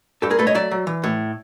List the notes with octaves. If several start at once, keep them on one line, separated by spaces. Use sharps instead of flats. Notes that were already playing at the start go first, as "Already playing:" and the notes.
G2 G4 A4
G#4 A#4
A3 A4 B4
C#5 D#5
F#3 D5 E5
F#3
E3
A2